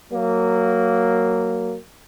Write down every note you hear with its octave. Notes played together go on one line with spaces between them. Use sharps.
F#3 A#3